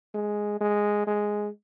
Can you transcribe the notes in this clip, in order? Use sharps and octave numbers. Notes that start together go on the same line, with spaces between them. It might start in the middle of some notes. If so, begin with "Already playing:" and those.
G#3
G#3
G#3